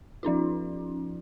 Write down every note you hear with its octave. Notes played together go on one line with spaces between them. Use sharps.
F3 C#4 D#4 F4